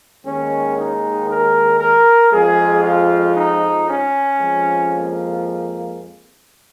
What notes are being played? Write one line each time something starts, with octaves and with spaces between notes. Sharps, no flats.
D#2 D#3 G#3 C#4
D#4
A#4
A#4
F2 F3 G#3 G#4
F4
D#4
C#4
F2 F3 G#3
A#3